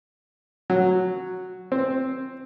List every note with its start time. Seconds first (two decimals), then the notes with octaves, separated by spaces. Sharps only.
0.70 F#3
1.72 C4